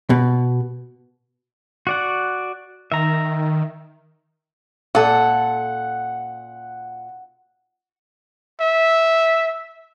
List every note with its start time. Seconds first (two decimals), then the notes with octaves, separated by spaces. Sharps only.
0.10 B2
1.87 F#4 D5 F#5
2.92 D#3 E5 A#5
4.95 A#2 A4 F#5
8.60 E5